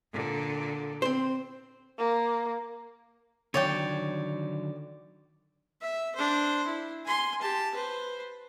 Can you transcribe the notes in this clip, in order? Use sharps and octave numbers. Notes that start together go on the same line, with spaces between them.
A#2 D3
C4 C5
A#3
D3 D#3 F#3 C#5 D5 G5
E5
D4 C5
E4
G#5 C6
G4 A5
B4 C5